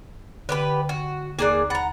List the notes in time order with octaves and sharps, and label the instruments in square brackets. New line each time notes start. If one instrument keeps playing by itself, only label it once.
[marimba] D3 [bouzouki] B3 G4 B4
[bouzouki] F#4
[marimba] D#2 F#6 [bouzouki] A#3 G#4 D5
[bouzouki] F#5 A#5 [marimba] B5 A6